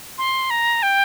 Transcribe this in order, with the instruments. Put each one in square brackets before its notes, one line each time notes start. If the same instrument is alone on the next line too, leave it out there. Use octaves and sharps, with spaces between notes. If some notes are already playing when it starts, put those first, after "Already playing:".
[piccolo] C6
A#5
G5